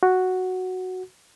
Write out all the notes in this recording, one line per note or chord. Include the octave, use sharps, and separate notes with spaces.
F#4